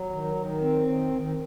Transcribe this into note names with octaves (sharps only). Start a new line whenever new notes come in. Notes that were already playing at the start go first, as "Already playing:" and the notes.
Already playing: F#3
D#3
D#3
C4
D#3
D#3